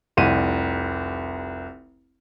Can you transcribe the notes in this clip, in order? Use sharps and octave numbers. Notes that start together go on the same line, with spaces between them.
F1 C2 D#7